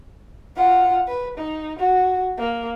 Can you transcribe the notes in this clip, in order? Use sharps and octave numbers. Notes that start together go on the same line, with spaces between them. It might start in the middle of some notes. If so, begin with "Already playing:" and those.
F4 F#5
B4
D#4
F#4
A#3